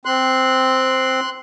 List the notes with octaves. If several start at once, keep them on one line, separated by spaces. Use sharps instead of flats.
C4 C6 F#6